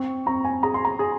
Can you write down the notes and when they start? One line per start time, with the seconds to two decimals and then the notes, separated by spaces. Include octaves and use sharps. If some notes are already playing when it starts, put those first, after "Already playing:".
Already playing: C4 C#6
0.26 C4 A#5
0.45 G#5
0.63 G#4 A#5
0.74 C6
0.85 A#5
0.99 G#4